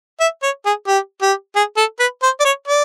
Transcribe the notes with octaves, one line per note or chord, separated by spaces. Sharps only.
E5
C#5
G#4
G4
G4
G#4
A4
B4
C5
D5
C#5
D5